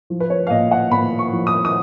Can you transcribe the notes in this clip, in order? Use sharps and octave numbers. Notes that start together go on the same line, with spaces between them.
F3
B4
C#5
F5
A#2 D#5
F#5
A#2 B5
C#6
F3
D#6
D#6